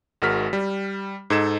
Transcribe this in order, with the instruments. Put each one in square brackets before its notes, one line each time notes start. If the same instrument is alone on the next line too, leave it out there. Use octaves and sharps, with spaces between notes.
[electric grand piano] G#1 G#3 F#4 A#4 F6 B6
G3
G#2 D#4 A4 G#6 E7